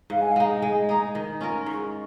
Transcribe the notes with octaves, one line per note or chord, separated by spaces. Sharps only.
G#2 F5
G#5
F5
G#3 D#4
G#3 G#5
D#4 G#4 A#5
D#3
C#4 F4 A#4
G#2 C#6